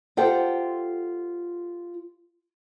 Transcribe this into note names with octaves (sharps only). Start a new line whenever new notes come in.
F4 G4 A4 C5 F#5 G5